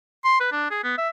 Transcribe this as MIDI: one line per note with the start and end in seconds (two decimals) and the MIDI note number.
0.24 0.39 84
0.40 0.50 71
0.52 0.68 62
0.71 0.79 68
0.84 0.93 59
0.98 1.08 76